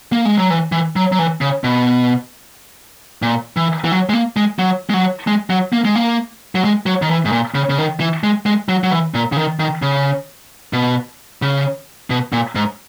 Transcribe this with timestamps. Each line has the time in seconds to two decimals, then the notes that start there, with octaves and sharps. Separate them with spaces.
0.12 A#3
0.25 G#3
0.38 F#3
0.50 E3
0.72 E3
0.96 F#3
1.12 F#3
1.19 E3
1.41 C#3
1.64 B2
3.22 A#2
3.57 E3
3.84 E3
3.92 F#3
4.09 G#3
4.13 A#3
4.37 G#3
4.59 F#3
4.90 G#3
4.94 F#3
5.27 G#3
5.50 F#3
5.73 A#3
5.85 G#3
5.95 A#3
6.55 F#3
6.64 G#3
6.86 F#3
7.02 D#3
7.10 E3
7.25 G#2
7.32 A#2
7.55 C#3
7.70 C#3
7.78 D#3
8.00 E3
8.24 G#3
8.46 G#3
8.69 F#3
8.84 F#3
8.91 E3
9.14 A#2
9.32 C#3
9.37 D#3
9.60 D#3
9.82 C#3
10.73 B2
11.42 C#3
12.10 B2
12.33 A#2
12.55 G#2